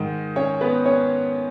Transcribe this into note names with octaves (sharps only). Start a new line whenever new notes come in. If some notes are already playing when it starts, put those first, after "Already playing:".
Already playing: G#2 D#3
C#4 C#5
B3 B4
C#4 C#5